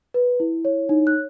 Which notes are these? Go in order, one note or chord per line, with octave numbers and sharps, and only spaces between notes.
B4
E4
C#5
D#4
F#6